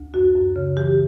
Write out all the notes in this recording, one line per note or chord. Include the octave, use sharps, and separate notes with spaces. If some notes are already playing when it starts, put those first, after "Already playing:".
Already playing: D2
F#2 F#4
F#2
C#3
E3 G4